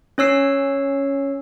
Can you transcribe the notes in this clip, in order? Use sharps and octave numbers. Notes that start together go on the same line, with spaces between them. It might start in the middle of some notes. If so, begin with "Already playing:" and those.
C#4 C#5 E6 C7